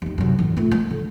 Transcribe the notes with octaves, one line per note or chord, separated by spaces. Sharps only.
D#2 D#3
F#2 C3
A2 E3
A3 F4
G#3
D3